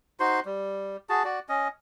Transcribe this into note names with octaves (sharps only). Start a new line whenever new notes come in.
D#4 F#4 C5 C6
G3
F#4 G#4 A5
F#4 D5
C#4 D#5